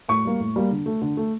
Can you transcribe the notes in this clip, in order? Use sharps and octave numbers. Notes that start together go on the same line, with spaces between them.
A2 C#6
G3 A#3
A2
G3 A#3
D3
A3
D3
A3